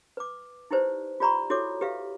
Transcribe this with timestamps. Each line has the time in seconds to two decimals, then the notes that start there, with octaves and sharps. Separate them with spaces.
0.17 B4 D6
0.71 D#4 E4 G4 B4 C5 D5
1.20 F4 G4 D5 A#5 B5 C#6
1.50 E4 F#4 A4 C#5 E5 D6
1.81 G4 B4 E5 F5